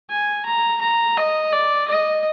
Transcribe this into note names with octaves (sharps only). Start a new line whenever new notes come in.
G#5
A#5
A#5
D#5
D5
D#5